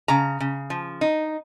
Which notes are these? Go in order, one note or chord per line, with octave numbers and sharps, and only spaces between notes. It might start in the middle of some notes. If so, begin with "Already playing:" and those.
C#3 A#5
C#3
F3
D#4